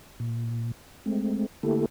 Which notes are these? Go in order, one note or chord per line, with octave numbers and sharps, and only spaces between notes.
A#2
G#3 A3 C4
D3 A3 A#3 E4 G4 A4